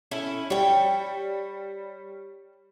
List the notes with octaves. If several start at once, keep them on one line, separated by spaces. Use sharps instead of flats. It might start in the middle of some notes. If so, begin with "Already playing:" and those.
C#4 E4 A4
G3 C#5 G5